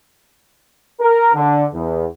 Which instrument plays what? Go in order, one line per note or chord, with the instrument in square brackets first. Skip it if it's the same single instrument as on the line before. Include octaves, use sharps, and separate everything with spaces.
[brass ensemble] A#4
D3
E2